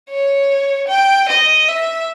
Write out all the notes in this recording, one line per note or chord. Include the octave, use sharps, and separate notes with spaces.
C#5
G5
D#5
E5